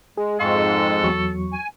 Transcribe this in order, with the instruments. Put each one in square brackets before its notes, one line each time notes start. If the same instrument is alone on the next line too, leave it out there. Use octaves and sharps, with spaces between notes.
[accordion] G#3 [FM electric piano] G#4
[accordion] F2 G#2 G#3 [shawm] A4 [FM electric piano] F5 C6 C#6
[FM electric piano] E2 F#3 C#6
[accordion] G#5